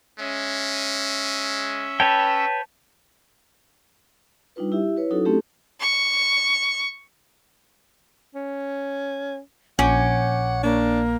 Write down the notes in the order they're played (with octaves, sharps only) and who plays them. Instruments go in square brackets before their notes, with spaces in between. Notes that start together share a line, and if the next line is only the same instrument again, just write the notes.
[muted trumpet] G#3 [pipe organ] C#4 E5
[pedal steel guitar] B4 C#5 G5 [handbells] A5
[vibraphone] G3 D4 D#4 F4 B4
E4 G4 E5
E4 B4 C#5
F#3 C#4 D#4 E4 F#4 A4
A3 C4 C#4 D#4 G4 A4
[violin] C#6
[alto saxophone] C#4
[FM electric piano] A#1 D6 G6 [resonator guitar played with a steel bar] C#4 [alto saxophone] F#5
[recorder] A#3 [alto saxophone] D4